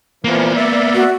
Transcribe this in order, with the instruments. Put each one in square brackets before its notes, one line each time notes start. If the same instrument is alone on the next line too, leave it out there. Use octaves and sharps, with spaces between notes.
[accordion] A#2 E3 F3 [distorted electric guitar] A#3 B3
[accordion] D5 E5
[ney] F#4